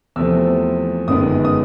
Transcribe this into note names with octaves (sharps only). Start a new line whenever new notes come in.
E2 C3 F3 A3 C4 E6
G1 F#2 D#3 G#3 B3 D#6
D#6